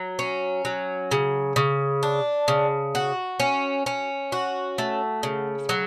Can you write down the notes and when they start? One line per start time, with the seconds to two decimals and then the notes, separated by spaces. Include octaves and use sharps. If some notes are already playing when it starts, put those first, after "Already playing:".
Already playing: F#3
0.19 C#4
0.65 F#3
1.11 C#3
1.56 C#3
2.03 D4
2.48 C#3
2.95 F#4
3.40 C#4
3.86 C#4
4.32 F#4
4.78 A3
5.23 C#3
5.69 F#3